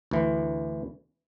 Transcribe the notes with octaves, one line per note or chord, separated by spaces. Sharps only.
D2 E3